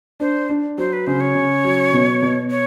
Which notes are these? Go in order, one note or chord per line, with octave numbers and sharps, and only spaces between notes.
D4 C5
D4
F#3 C5
B4
C#3 C5
C#5
C#3
F#3
B2
B2
C#5